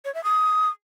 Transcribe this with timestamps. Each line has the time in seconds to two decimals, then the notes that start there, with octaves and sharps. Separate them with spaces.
0.05 C#5
0.14 E5
0.24 D#6